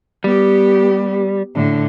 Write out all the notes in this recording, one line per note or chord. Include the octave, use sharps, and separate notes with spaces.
G3 B3 G4
A2 D3